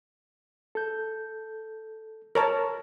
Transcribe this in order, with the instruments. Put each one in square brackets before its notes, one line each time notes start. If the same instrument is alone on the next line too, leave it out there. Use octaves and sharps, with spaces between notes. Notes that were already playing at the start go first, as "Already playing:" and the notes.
[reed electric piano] A4 G6
[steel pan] A#4 C#5 A5